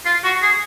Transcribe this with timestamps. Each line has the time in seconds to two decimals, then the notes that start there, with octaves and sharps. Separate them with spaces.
0.05 F4
0.24 F#4
0.42 G#4